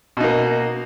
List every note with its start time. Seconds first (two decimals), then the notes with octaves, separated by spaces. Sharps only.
0.17 B2
0.20 D#4
0.24 A#3